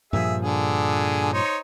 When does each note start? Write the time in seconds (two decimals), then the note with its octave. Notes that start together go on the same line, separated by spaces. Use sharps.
0.13 G2 A#2 F3 G#4 E5
0.42 D3 G#4
1.33 D#4 C5 C#5